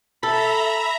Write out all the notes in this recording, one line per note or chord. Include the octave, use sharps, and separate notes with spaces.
A4 E5 A#5 B5